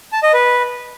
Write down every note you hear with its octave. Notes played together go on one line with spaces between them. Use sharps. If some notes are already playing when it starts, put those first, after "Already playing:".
A5
D#5
B4